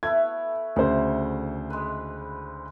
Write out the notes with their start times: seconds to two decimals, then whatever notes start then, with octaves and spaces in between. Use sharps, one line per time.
0.03 A3 B3 E4 G#6
0.76 D2 C#3 C5 F#5
1.70 G#3 B4